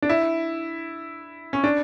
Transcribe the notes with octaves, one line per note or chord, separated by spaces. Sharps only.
D4
E4
C#4
D4